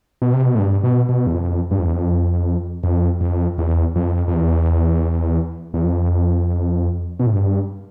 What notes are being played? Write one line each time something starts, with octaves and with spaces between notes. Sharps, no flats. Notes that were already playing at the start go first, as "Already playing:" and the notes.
B2
C3
B2
A2
G2
B2
B2
E2
F2
G2
F2
E2
F2
F2
F2
E2
F2
F2
E2
E2
F2
B2
A2
G2